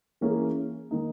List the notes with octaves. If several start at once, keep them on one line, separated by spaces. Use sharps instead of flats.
E3 A#3 C#4 G#4
D#3 A#3 D#4